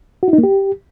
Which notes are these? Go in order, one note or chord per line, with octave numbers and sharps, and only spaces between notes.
F#4
E4
D#4
A#3
G4